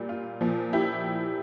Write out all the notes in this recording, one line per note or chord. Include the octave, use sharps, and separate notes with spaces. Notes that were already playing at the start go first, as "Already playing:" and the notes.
Already playing: A#2 G3
F4
A#2 F3
E4 G4